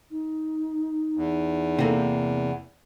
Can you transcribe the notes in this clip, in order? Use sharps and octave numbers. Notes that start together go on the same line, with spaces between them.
D#4
E2
C3 A#3 A4